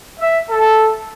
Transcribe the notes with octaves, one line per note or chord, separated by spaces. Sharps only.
E5
A4